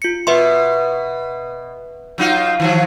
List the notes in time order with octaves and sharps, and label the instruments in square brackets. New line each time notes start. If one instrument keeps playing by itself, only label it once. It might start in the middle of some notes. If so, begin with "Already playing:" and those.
[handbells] F4 C#7
[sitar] B2 [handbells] B4 E5 C6
[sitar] F#3 D#4 F4
D#3 F3 F#3